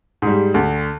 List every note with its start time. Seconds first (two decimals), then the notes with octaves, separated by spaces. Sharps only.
0.22 G#2 G3
0.54 D2